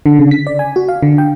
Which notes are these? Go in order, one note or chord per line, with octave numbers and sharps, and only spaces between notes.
D3
C#3
B6
D5
G#5
F#4
F5
D3
G5